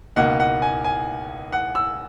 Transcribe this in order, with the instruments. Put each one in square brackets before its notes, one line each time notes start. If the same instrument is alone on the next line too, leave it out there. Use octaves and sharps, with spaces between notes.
[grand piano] C#2 B2 A#3 D#4 F#5
F#5
G#5
G#5
F#5
E6